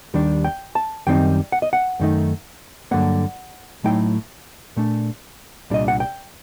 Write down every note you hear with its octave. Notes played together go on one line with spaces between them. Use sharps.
D#2 D#3 G3 D4
G5
A5
F#2 D#3 G3 C4 D#4 G5
F#5
D#5
F#5
F#2 D#3 A3 D#4
G2 D3 F#3 A#3 F#5
A2 F#3 A3 D#4 G5
A#2 A3 D4
C2 A#2 G3 D4 D#5
F#5
G5